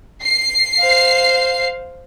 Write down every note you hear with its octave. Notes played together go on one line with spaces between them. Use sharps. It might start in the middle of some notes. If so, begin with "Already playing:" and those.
C7
C5 F5